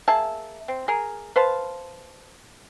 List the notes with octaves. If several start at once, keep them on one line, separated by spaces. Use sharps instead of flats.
A#3 G#4 E5 A5
C4
G#4 A#4
B4 C5 F5 A5